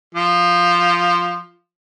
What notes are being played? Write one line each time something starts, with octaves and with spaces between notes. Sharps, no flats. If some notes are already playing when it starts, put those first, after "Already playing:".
F3